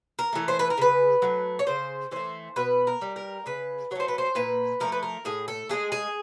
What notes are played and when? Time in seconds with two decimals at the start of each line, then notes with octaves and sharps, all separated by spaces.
0.19 A#4
0.33 E3 A3
0.48 C5
0.59 B4
0.70 A#4
0.78 C#3 B4
1.22 F#3 A3
1.59 C#5
1.67 C#3 C5
2.11 E3 A3 C5
2.56 B2 B4
2.87 A#4
3.01 G3
3.16 A#4
3.46 C#3 B4
3.91 F#3 C#5
3.95 A3 C5
4.08 B4
4.18 C5
4.35 A#2 B4
4.80 F3 A3 A#4
4.92 B4
5.03 A#4
5.25 A2 G#4
5.48 A4
5.69 E3 G#3 G#4
5.92 G#4